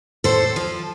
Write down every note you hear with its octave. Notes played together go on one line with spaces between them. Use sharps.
A2 A4 C5
F3